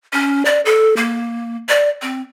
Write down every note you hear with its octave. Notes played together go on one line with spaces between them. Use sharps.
C#4
D5
A4
A#3
D5
C4